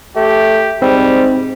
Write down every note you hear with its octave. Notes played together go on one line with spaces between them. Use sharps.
A3 G4
G#2 G3 C4